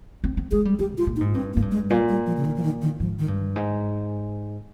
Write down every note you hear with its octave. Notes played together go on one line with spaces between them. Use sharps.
C4
C4
G#3 G#4
G3
G3 G4
A#2
F4
A#2
D#4
G#2
G2 C4
A#3
G#2
G2
G#3
A#2 G3
G3
F3
C#3
D#3
F3
D#3
D#3
G#2 F3
D#3
G2
G#2